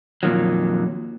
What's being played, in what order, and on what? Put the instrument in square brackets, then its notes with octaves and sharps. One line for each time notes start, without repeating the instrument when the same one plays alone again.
[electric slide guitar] F2 A#2 D#3 F#3